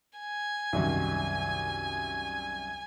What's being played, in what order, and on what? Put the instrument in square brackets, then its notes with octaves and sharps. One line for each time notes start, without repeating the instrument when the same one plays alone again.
[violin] G#5
[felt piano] C2 F#2 D#3